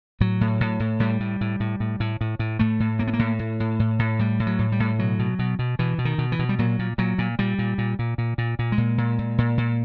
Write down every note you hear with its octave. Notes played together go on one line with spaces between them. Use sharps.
A2 F#3
A2
A2
A2
A2 G3
A2
A2
A2
A2
A2
A2
A2
A2 A3
A2
A2 A#3
B3
A#3
A2
A2
A2
A2
A2
A2 G3
A2
F#3
A2
G3
A2
B2 F#3
B2
B2
B2
B2 E3
B2
D#3
B2
E3
B2
G3
A#2 F#3
A#2
A#2 F#3
A#2
A#2 G3
A#2
A#2
A#2
A#2
A#2
A#2
G#3
A#2
A#2
A#2
A#2
A#2